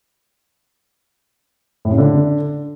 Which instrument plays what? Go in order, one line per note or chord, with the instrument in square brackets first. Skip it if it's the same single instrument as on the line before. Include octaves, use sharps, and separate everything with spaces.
[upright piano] A2
C#3
D3